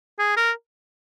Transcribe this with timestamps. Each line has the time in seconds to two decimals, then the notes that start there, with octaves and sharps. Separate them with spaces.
0.19 G#4
0.37 A#4